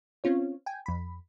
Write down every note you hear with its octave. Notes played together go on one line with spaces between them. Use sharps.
C4 C#4 F4 C#5
G5 G#5
F2 B5